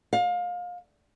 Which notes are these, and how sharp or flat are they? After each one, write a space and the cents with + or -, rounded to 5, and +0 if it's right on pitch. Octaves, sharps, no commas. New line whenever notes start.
F5 +30